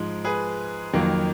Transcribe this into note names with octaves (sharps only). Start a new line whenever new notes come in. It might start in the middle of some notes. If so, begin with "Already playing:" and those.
Already playing: G#2 F3 G#3
G#4 B4
F2 D#3 F#3 A#3